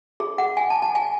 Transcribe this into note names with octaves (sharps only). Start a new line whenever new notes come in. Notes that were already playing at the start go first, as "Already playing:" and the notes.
G#4
F#5
G#5
A5
A5
G#5